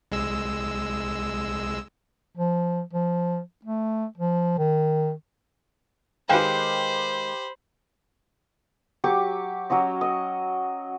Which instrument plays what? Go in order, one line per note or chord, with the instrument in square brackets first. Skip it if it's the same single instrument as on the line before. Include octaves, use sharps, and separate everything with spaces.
[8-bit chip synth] C2 G#3 E6
[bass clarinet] F3
F3
A3
F3
D#3
[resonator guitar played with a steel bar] D#3 G#3 G5 [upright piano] G4 B4 F5 [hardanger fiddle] C5 B5
[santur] F#3 G4 C#6 D6
F#3 C#4 F#4 D#5
D#5